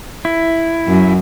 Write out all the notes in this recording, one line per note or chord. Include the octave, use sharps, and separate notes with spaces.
E4
F#2